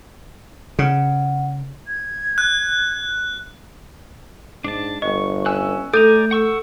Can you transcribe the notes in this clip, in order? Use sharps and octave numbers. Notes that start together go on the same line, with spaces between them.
C#3 F#5
G#6
F#6
G#2 D4 A5
G1 D#5 C#6
C#4 G#5 E6 F#6
A3 A4 D5 G#5 A#5 G6
F#5 C#6 E6